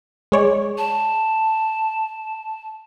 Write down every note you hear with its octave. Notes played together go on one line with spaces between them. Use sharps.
G#3 C#5 D5
A5